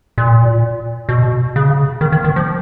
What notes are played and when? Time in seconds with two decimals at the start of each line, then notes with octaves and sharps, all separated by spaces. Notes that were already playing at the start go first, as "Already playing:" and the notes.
0.18 A#2
1.09 B2
1.56 C#3
2.01 D#3
2.12 D#3
2.24 D#3
2.36 F3